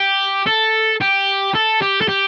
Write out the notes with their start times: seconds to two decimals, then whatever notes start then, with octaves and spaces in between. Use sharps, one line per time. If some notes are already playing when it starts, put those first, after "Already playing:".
Already playing: G4
0.47 A4
1.01 G4
1.55 A4
1.82 G4
2.01 A4
2.09 G4